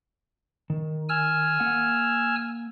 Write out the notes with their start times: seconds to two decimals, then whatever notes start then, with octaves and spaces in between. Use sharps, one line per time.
0.70 D#3
1.09 G#5 E6 F6
1.60 A#3 F#5